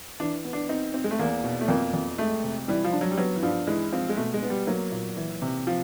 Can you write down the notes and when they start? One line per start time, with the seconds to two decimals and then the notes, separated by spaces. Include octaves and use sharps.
0.20 E3 D4
0.45 B3
0.53 D4
0.69 C4 D#4
0.94 C4
1.04 G#3
1.11 A3
1.19 E2 A#3
1.44 B2
1.61 A3
1.68 F2 A#3
1.93 F2
2.18 G#3 A3
2.44 C3
2.68 E3 G3
2.84 F3
2.92 D4
3.01 F#3
3.11 G3
3.18 F#3 B3
3.36 E3
3.43 G2 F3
3.67 E3 G#3
3.92 F3 C4
4.09 G#3
4.17 B2 A3
4.34 G#3
4.43 B3
4.50 G3
4.67 F#3 A#3
4.91 A#2
5.16 E3
5.42 C3
5.67 F3